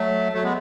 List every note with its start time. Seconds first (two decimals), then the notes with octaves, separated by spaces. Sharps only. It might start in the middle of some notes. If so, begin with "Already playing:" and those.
Already playing: F#3 A3
0.33 F#3 A3
0.43 G#3 B3